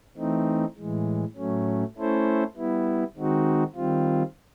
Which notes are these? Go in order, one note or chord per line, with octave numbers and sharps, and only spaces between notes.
E3 A3 C4 D#4
A2 E3 G#3
A2 F#3 A3 C#4
A3 C#4 E4 A4 C5
G3 B3 E4
D#3 G#3 C4 D#4 F#4
D#3 G3 C4 F4